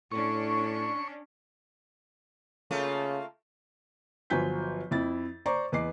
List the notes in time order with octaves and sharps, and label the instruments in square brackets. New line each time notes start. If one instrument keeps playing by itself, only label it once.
[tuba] A2 [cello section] C#4 D4 [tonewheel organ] C#6
[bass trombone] C#3 [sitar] A3 A#3 F4
[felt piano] G1 F3 F#3 G#5 G6 B6
F2 E4 A6
C5 D5 A#5 C#6 D6
E2 B4 D#5 D6 C7